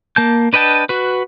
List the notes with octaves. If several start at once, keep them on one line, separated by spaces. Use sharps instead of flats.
A#3 A5 G6
D4 B4 D#5 G5 A5
F#4 B4